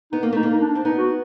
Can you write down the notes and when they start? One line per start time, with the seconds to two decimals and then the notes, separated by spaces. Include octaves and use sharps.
0.12 B3 D#4
0.23 A#3
0.33 A3 D#4
0.43 A#3
0.52 D#4
0.60 D4
0.75 C4
0.85 B3 D#4
0.98 F#4